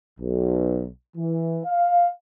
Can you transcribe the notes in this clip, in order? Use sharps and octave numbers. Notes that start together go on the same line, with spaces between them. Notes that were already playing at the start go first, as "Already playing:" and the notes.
B1
E3
F5